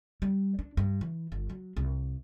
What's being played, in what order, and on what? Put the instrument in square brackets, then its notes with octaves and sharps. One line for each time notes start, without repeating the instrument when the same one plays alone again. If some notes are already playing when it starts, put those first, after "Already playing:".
[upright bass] G3
D4
G2
E3
G1
F#3
C2